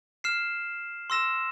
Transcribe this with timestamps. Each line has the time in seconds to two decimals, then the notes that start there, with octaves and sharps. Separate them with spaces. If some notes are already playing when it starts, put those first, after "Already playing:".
0.24 F6 C7 E7
1.10 C6 E6 A#6 E7